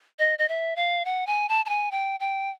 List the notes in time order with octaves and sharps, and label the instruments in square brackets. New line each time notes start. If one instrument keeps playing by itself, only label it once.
[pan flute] D#5
D#5
E5
F5
F#5
G#5
A5
A5
G#5
G5
G5